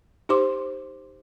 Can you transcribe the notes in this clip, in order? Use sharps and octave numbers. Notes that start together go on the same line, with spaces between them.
D#4 G4 C5 C6 D6